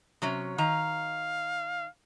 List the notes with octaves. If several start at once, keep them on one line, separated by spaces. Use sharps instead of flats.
C3 F#3 C#4
D#3 F5 A#5